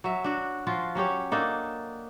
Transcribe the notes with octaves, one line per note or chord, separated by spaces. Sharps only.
F#3 E5
D4 F#4
F3 F4 F#4
F#3 C#4 G4 C#5
A#3 D4 D#4 A4